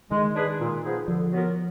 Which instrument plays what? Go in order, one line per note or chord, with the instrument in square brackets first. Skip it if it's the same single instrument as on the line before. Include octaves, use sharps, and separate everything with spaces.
[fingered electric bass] D#3 [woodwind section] G#3
[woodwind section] D4 G#4 B4
A#2
F3 B3 D#4 G#4
[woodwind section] D3 [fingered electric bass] F3
[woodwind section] F#3 B3 F4 A#4